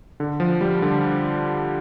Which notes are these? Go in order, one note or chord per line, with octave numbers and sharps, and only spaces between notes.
D3
F3
G3
D3